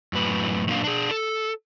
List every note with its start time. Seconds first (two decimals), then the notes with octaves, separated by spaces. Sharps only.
0.13 F#2 A2 B4
0.68 F#2 A#2 A#3 D4 F#4 F5
0.84 D4 G#4
1.11 A4